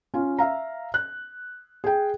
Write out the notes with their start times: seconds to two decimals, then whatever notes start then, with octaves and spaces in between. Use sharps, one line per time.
0.14 C#4 F4
0.38 E5 F5 A#5
0.94 F#6
1.84 G#4 G5